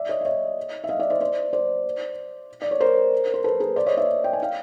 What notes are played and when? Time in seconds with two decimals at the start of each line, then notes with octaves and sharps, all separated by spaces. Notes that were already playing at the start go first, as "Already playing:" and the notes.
Already playing: D5 E5
0.09 C#5 D#5
0.21 E5
0.25 C#5 D#5
0.84 E5
0.89 D#5 F5
0.99 D5 E5
1.10 C5 D5
1.21 C5 D5
1.53 C5 D5
2.62 D5
2.71 C#5
2.80 A#4 C5
3.34 C5
3.44 A4 B4
3.60 G#4 A#4
3.76 C5 D5
3.86 C#5 D#5
3.97 D5 E5
4.24 G5
4.33 G#5
4.42 F5 G5